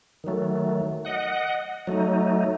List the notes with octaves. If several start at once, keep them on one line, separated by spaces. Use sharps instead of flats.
D#3 F#3 A3
D#5 F#5
F#3 A3 D#4